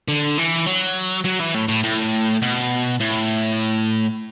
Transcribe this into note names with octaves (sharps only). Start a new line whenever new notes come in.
D3
E3
F#3
F#3
E3
A2
A2
A2
B2
A2